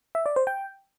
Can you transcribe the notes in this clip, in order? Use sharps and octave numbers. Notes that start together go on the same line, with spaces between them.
E5
D5
C5
G5